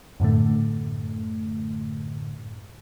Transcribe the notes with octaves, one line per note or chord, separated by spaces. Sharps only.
F#2 A2 D3 A3